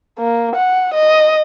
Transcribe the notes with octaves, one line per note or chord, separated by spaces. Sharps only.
A#3
F#5
D#5